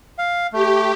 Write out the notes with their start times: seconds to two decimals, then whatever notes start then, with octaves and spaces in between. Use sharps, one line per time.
0.19 F5
0.53 A3 G4